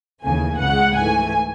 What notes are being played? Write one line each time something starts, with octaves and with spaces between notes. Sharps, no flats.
D#2 C#3 E3 A3 G#5
C#2 C#3 G#3 F#5
G#2 E3 A3 G#5